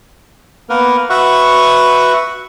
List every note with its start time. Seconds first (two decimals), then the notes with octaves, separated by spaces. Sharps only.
0.70 A#3 B3 A#4 B4
1.10 F#4 B4 E5 F#5 C#6